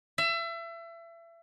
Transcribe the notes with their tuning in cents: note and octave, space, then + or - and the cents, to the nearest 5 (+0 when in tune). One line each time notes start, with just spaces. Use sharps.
E5 +30